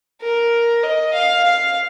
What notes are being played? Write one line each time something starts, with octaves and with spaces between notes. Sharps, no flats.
A#4
D#5
F5
F5